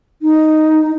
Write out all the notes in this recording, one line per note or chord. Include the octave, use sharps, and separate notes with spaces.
D#4